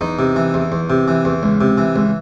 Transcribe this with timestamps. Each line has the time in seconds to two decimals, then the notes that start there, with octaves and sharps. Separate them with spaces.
0.01 E2 D#4
0.19 C3
0.36 E3
0.54 E2
0.72 E2
0.90 C3
1.08 E3
1.25 E2
1.43 C#2
1.61 C3
1.78 E3
1.96 C#2